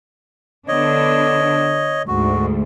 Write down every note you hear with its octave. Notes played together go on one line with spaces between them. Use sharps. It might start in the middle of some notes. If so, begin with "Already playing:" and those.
D3 B3 D4 C#5 D#5
D2 G#2 F#4